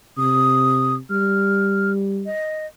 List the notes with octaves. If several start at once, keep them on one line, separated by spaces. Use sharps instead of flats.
C3 D#6
G3 F6
D#5